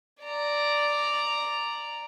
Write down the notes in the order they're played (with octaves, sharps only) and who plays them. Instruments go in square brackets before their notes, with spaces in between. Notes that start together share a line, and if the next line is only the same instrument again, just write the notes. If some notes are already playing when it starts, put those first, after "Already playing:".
[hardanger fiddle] D5 A#5